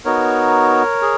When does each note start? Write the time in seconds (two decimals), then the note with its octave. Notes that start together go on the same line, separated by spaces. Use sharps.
0.05 B3 D#4 F#4 A#4 C#5
1.02 G#4